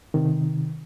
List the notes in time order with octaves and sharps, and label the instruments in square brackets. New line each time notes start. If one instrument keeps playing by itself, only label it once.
[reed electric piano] C3 D#3